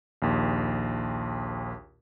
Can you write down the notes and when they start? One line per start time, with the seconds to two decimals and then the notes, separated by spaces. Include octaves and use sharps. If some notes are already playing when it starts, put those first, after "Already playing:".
0.22 A#1 D#2